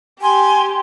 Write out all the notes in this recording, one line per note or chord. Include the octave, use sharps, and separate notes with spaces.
G4 G#5 C6